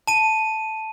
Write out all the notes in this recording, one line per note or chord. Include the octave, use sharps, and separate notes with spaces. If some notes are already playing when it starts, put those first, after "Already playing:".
A5 D#7